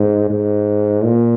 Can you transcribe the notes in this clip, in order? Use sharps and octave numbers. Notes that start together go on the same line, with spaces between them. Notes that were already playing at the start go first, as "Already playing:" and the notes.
Already playing: G#2
G#2
A#2